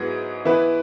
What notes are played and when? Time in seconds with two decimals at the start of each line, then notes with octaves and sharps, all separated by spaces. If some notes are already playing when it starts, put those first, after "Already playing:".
Already playing: G#2 F#3 B3 E4 G#4
0.45 E3 B3 E4 B4